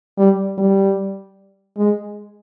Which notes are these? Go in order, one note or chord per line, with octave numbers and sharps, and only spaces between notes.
G3
G3
G#3